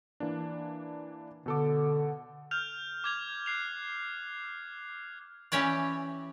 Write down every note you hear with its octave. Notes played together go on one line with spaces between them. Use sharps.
E3 A#3 D4
B2 D3 A4 D6
F6 G6 F7
D6 G#6 F7
F#6 C7 F7
E3 C#4 G4 C#5 D5